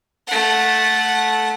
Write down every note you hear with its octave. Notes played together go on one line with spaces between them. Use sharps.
A3 F#5